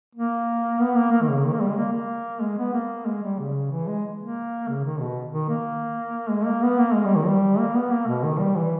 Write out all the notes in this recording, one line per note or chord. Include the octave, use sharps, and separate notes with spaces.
A#3
B3
A#3
A#3
D#3
C#3
D#3
A#3
G3
G#3
A#3
A#3
G#3
B3
A#3
G#3
G3
C#3
E3
G#3
A#3
C#3
D#3
B2
D#3
A#3
G#3
A#3
B3
A#3
G#3
G3
D#3
G3
A#3
B3
A#3
B2
D#3
G3
E3